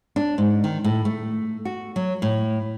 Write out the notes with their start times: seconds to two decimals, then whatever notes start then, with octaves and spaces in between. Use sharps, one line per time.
0.16 D4
0.38 G#2
0.64 D#3
0.84 A2
1.05 A3
1.65 F#4
1.96 F#3
2.22 A2